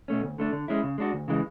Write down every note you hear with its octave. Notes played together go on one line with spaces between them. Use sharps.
B2 A3 C#4
D2
D3 A3 D4
D3
G#3 C#4 E4
C#3
G#3 D4 F#4
D2
C#3 E3 G#3